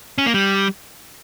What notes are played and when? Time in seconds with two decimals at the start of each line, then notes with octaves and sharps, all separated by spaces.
0.18 C#4
0.26 A#3
0.34 G3